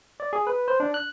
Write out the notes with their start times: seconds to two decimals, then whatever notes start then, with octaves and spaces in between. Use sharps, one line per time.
0.20 D5
0.33 G#4
0.47 B4
0.68 C5
0.80 D4
0.94 F#6